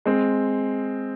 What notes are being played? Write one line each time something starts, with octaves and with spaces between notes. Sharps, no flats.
G#3 C4